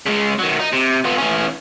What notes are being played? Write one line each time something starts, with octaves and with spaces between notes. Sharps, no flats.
C#3 G#3
D#3 F#3
D#4
C3
B3 F4
E3 C#4